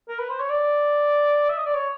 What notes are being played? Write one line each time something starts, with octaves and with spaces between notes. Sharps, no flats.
A#4
B4
C5
C#5
D5
E5
D#5
D5
C#5